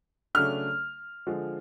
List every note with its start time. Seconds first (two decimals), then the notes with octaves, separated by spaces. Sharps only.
0.35 C#3 F#3 A3 D4 F6
1.27 D3 F3 G#3